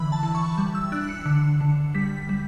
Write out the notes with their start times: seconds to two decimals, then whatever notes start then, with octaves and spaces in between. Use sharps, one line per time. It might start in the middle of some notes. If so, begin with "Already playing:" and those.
Already playing: D3 E3 B5
0.12 A5
0.23 E3
0.35 C#6
0.57 G3
0.75 E6
0.92 D4 F#6
1.09 C#7
1.26 D3
1.60 D3
1.95 G3 B6
2.29 G3